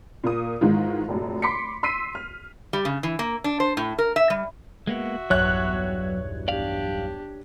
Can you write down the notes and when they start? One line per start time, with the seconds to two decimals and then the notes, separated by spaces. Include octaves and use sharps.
0.24 A#2 A#3 D#6
0.61 G#2 D#3 E3 G#3 F4
1.08 F1 A#1 F#2
1.42 B5 C6 D6 B6 C#7
1.83 C6 E6 B6 C7 D#7
2.15 F6
2.73 G3
2.85 C#3
3.03 E3
3.19 A#3
3.44 D4
3.60 C5
3.77 A2
3.98 A#4
4.16 E5
4.30 G3
4.87 G#3 A#3 B3 F#4 E5
5.30 B1 E2 G2 F#3 C#5 F#6
6.48 D4 G4 D5 F5